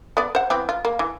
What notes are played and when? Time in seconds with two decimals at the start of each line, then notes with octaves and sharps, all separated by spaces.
0.17 B3 D5
0.35 C5 F#5
0.50 E3 B3 C4
0.69 F4
0.85 A#3
0.99 E3